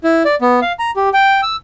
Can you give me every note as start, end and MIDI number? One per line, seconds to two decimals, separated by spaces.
0.04 0.23 64
0.25 0.35 74
0.41 0.60 59
0.62 0.72 77
0.79 0.91 82
0.96 1.09 67
1.13 1.41 79
1.43 1.56 88